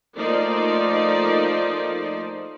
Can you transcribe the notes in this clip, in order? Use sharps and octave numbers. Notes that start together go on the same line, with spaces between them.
F3 A3 A#3 D#4 C5 D5